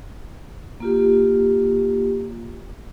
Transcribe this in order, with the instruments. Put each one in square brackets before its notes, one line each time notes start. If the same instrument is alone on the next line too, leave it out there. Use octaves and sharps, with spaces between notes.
[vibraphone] A#3 F4 G4